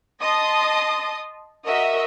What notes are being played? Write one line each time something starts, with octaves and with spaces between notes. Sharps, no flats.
D#5 A5 C6 D#6
F#4 A#4 D#5 E5